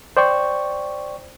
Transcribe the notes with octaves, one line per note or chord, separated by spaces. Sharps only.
C5 D5 G5 C#6